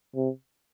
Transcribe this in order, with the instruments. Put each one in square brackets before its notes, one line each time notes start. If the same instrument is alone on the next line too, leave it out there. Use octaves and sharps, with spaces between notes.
[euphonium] C3